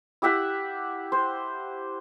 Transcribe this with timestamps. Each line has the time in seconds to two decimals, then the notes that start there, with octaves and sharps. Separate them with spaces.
0.22 E4 G4 E5 F#5
1.12 C5